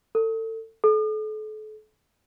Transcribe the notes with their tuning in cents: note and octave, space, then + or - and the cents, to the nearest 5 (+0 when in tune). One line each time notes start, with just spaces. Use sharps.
A4 +30
A4 -35